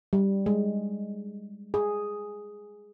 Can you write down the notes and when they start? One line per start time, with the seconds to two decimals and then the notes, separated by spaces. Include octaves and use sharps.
0.13 G3
0.46 G#3
1.74 G#4